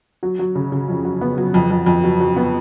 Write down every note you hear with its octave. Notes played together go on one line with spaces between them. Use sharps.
F#3
F#3
C#3
C#3
F2
F#3
B3
F#3
F2
F2
F2
F#3
F#3
B3